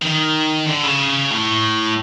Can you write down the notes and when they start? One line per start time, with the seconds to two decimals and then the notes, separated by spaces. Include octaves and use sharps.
0.02 D#3
0.67 D3
0.83 C#3
1.31 A2